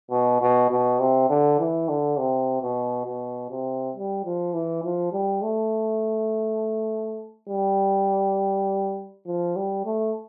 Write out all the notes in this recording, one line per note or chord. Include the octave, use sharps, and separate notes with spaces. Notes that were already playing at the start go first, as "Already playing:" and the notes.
B2
B2
B2
C3
D3
E3
D3
C3
B2
B2
C3
G3
F3
E3
F3
G3
A3
G3
F3
G3
A3